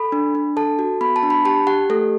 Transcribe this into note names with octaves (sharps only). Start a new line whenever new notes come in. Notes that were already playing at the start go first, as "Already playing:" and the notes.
Already playing: A4 B5
D4
D4
A4 A5
F#4
B3 B5
A5
D4
B5
G4 A5
G4 F#5
A3 A4